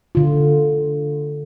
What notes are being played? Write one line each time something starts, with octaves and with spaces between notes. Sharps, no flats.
D3 F4